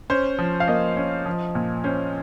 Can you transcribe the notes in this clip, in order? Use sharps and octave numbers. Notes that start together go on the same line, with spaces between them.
C#4 C5
F3
F5
A#3 D#5
C#4
F3
A#2
C#4 C5